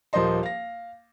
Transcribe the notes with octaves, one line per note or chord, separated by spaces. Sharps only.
D#1 F3 A#3 C5 D#5 C6
F5 A#6